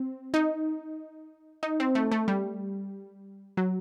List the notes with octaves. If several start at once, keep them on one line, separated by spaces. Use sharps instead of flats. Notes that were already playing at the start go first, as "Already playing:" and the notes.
Already playing: C4
D#4
D#4
C4
A3
A3
G3
F#3